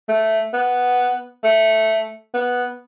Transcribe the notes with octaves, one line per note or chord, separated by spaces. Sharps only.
A3
B3
A3
B3